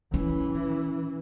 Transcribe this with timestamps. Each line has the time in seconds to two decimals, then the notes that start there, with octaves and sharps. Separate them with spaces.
0.14 E3 C#4